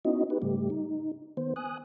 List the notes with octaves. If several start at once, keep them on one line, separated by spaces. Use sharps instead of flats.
B3 C#4 D#4 E4 F#4 D#5
D#4 G4 B4
G#2 C#3 G3 A3 G4
D#4
D#3 B3 C5
G#5 D#6 F#6